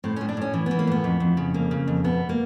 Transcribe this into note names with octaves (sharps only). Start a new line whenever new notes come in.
A2 C4
A2 C#4
D4
A2 C#4
E3
E3 B3
A#3
A2 B3
F2
F2
C#3
F2 A#3
C#3
F2
B2 B3
A#3